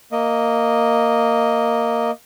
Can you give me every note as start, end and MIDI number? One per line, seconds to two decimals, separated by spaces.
0.12 2.11 58
0.12 2.11 75